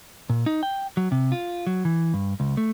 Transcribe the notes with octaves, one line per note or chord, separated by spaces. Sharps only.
A#2
D#4
G5
F#3
C3
F4
F#3
E3
G2
C#2
A3